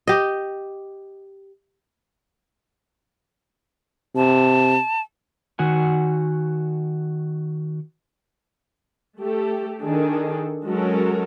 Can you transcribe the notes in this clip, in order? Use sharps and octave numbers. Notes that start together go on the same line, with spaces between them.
G4 D#5
C3 A5
D#3 F#4 F#5 G#5
A3 G4 A4
D#3 D4 G#4 A4
F#3 G#3 C#4 F#4 A4 A#4